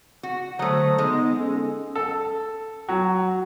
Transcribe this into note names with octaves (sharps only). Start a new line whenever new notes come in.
F#4
D3 F#3 A3 C5 D#6
G#3 B3 D#4 D#5
C#4 A4
A4
F#3